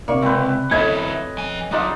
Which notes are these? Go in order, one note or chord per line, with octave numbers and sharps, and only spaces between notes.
C3 A#3 D5 C#6
C#2 C4 B4
F#3 B3 C#4 E4 A4 D#5 G#6
F3 G#5
F#3 D4 D#4 F4 G#4